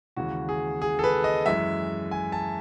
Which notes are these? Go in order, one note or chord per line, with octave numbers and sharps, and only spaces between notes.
D#2 C#3 E3 G#3 F#4
G#4
G#4
A4
B4
D#5
F#2 E3 G#3 E5
G#5
A5